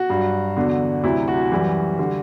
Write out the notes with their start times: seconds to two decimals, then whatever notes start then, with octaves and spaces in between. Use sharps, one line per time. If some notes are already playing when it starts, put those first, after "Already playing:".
Already playing: F#4
0.10 G2 F#3
0.56 E2 D3 F#3
1.04 D2 C3 F#3 E4
1.28 F#4
1.52 F#2 E3 G3
1.99 D3 G3